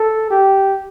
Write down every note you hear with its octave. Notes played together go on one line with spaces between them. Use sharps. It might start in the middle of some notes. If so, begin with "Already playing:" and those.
Already playing: A4
G4